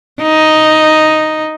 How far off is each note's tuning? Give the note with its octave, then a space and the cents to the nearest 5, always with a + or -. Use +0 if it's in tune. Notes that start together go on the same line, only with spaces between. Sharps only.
D#4 +0